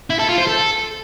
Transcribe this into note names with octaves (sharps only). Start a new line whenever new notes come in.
E4
A4
F4
C5
A4